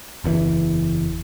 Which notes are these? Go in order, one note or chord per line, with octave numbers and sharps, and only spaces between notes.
F#1 E2 C#3 E3